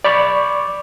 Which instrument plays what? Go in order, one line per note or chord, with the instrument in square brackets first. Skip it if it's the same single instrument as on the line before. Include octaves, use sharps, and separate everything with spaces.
[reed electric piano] D5 B5 C#6 D6